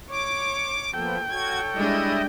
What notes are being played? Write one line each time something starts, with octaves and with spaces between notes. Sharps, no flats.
C#5 D6
F3 A#3 B3 A4 G5
F#4 A4 C#5 G#6
G3 G#3 D4 E4 D#5